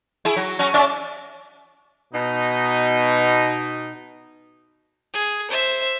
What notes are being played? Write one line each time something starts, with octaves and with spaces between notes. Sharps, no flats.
E4 G#4
F#3
F#3 C#4
C#4 D5 E5
B2 D#4
G#4
C5 E5